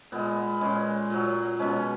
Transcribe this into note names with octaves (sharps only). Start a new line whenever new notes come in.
A#2 G#3 B3
B3
A#2 G#3 C#4
A#2 F#3
B2 G#3 C#4